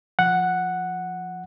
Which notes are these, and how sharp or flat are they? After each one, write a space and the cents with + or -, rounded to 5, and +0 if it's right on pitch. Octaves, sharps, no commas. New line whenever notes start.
F3 +0 F#5 +0